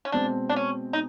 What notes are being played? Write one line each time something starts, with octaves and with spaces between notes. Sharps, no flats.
C#4
B2 G#3 C4 D4
D4
C#4
D#4